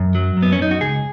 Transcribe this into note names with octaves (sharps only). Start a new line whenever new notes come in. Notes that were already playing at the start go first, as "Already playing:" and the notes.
Already playing: F#2
F#3
F#2
B3
C#4
F#2 D#4
F#4
C#2 G#4